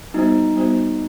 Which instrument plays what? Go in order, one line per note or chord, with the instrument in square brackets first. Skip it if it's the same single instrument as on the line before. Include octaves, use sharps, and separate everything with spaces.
[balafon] G3 B3 F#4 C5 [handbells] D#4
[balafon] G3 B3 F#4 C5